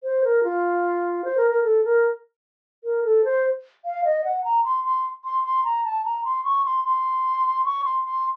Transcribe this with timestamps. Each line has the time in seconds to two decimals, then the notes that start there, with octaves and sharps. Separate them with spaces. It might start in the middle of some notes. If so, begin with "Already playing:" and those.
0.03 C5
0.24 A#4
0.44 F4
1.25 C5
1.37 A#4
1.51 A#4
1.64 A4
1.85 A#4
2.84 A#4
3.04 A4
3.25 C5
3.85 F5
4.05 D#5
4.25 F#5
4.44 A#5
4.64 C6
4.84 C6
5.25 C6
5.44 C6
5.64 A#5
5.85 A5
6.05 A#5
6.25 C6
6.44 C#6
6.65 C6
6.85 C6
7.65 C#6
7.85 C6
8.05 C6